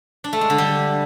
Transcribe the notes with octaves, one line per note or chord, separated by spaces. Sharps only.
D4
A3
G#3
D3
G3